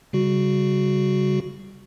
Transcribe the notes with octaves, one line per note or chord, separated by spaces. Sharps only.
C#3 G3 F#4